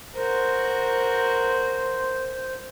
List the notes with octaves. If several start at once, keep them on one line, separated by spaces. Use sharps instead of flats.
F#4 A#4 C5